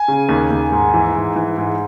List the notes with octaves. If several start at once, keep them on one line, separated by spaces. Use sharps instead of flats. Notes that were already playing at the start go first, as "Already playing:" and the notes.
Already playing: G#5
C#3
D#2
D#2
G#2
E3
G#2
E3
G#2